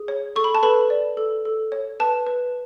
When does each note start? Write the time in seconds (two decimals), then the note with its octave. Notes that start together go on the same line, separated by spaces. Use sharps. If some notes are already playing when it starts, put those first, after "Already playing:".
Already playing: G#4
0.08 C#5
0.36 A4 C#6
0.44 B5
0.55 A5
0.63 A4 B4 B5
0.90 D5
1.17 A4
1.45 A4
1.72 C#5
2.00 B4 A5
2.27 B4